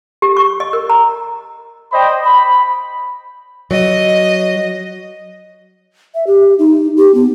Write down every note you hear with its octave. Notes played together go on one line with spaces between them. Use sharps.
G4
C#6
D#5
A#4
A#5
C5 D5 D#5 G5 B5
B5
F#3 D#5
E5
G4
D#4
G4
B3